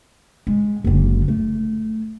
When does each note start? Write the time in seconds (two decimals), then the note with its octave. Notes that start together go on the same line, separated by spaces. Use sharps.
0.47 G#3
0.84 F#1 D3
1.28 A3